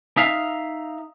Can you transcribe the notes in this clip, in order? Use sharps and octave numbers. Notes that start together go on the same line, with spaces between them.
D#4 E5 F5